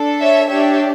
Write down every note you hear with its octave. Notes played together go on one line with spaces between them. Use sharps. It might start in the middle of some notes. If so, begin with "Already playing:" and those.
Already playing: D4 A4
C#5 E5
D4 G4 C#5 E5